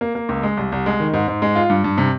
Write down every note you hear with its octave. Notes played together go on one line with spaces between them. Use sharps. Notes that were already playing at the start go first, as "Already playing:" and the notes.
A#3
A#3
C#2
G#3
C2
C2
G#3
D#3
G#2
G#2
G#3
F4
G2
G2
C3